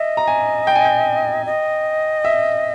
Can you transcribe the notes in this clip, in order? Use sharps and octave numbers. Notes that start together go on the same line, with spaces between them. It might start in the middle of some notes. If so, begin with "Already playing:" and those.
Already playing: D#5 E5
A#5
G#5
G5
G#5
G5
D#5
E5